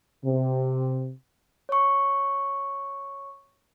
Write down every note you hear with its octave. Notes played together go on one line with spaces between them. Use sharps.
C3
C#5 C#6